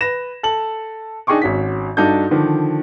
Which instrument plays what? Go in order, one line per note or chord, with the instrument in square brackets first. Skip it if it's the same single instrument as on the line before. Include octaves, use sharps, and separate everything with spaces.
[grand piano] B4 A#6 E7
A4 F#7
D4 D#4 G#4 G5 C#6 D6
G#1 C#4 F#4 B6
G2 D4 D#4 F#4 A4 G6
D3 D#3 F3